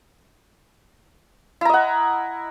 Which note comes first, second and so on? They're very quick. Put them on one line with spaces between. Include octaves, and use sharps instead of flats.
E4 A#5 D#5 F#5